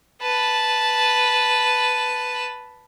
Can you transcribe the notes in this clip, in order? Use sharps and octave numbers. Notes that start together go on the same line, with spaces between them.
B4 A5